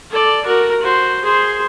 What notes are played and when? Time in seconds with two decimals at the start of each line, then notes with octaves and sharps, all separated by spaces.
0.11 A4 D5
0.45 F#4 A#4
0.81 F#4 C5
1.24 G#4 C5